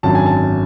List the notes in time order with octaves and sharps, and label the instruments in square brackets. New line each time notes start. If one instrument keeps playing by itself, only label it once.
[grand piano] G#1 F#2 D3 F#3 A5
G#5
A5